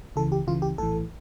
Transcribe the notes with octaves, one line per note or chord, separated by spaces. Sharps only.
C#2 C#3 E3 A4
G4
C#2 C#3 E3 F4
G4
A#1 A2 E3 A4